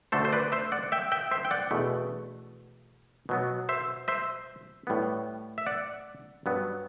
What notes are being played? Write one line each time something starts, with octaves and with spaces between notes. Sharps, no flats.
D2 D3 A3 A4 C5
C5
B4 D5
C5 E5
D5 F#5
E5 G5
E5 G5
C5 E5
G5
D5 F#5
E2 B2 A3
B2 F#3 B3
C5 E5
C5 E5
A2 G3 B3
E5
D5 F#5
G2 F#3 B3